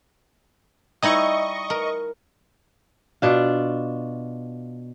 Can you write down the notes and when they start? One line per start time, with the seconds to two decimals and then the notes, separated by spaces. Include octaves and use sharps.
1.03 G3 D#4 E4 D#5 C#6
1.70 A#4
3.22 B2 D4 F4